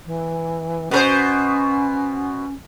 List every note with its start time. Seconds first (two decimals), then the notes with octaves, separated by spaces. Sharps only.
0.05 E3
0.91 B2 C#4 A#4 C5